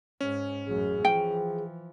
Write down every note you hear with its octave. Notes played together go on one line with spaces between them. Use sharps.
G#2 C#4
A1 F#2 G#4
E3 F3 G5